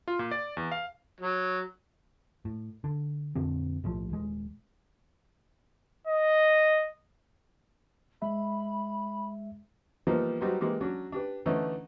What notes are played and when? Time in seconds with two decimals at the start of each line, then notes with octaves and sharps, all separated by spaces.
0.08 F4
0.19 A#2
0.31 D5
0.57 E2
0.72 F5
1.20 F#3
2.45 A2
2.84 D3
3.35 F2 A#2 D3 C4
3.84 B1 A2 F3
4.10 D#1 G#3
6.07 D#5
8.22 G#3 E5 B5
10.07 E3 F3 G3 A#3 B3 D#4
10.41 F#3 G3 D#4 F#4 B4 C5
10.61 E3 G#3 A#3 G4
10.81 F#3 C#4 D4 F#4
11.12 D4 G4 B4
11.46 D3 E3 A3 C#4 D#4